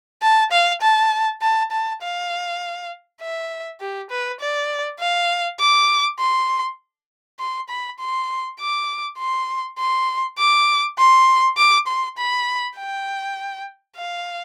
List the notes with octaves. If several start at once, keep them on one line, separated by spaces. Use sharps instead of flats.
A5
F5
A5
A5
A5
F5
E5
G4
B4
D5
F5
D6
C6
C6
B5
C6
D6
C6
C6
D6
C6
D6
C6
B5
G5
F5